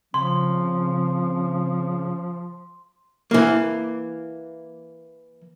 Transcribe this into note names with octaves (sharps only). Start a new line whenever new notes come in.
C#3 F3 C4 C6
E3 A#3